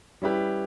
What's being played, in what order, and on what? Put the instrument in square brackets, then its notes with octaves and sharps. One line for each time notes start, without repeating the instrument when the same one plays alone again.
[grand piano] G3 C#4 E4 G4 B4